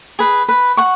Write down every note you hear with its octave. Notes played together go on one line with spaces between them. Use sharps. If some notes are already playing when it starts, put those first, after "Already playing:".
G#4 B4
B4
F#5 C#6